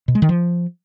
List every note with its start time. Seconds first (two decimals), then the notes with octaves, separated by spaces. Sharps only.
0.08 B2
0.15 G#3
0.22 D#3
0.29 F3